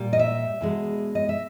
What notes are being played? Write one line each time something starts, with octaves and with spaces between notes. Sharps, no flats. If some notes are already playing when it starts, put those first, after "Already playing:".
Already playing: A#2 G3
D#5
E5
E2 B2 G#3
D#5
E5